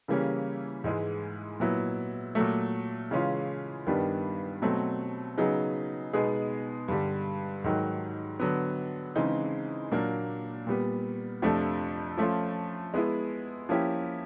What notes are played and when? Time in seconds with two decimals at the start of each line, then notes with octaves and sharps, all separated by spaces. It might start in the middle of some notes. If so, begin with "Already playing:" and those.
0.08 C#3 E3 G3 A#3 C#4
0.84 G#2 E3 G#3
1.60 A#2 F#3 B3 E4
2.35 A#2 F#3 A3
3.11 C#3 E3 G#3 C#4 F4
3.87 G2 D#3 G3 B3 D4
4.62 B2 F#3 A3 C4
5.38 C#3 F#3 B3 D#4 G#4
6.13 B2 G#3 B3 D#4 G#4
6.88 G2 D3 G3
7.64 G#2 D#3 F#3
8.40 D3 F#3 B3
9.16 C#3 E3 G#3 C4 D#4
9.91 A#2 F#3 A#3 D4
10.67 A#2 G3 B3
11.42 F2 C3 F3 A3 D4
12.17 F3 A3 C#4 F4
12.94 G#3 B3 E4
13.69 F3 A#3 C#4 E4 G4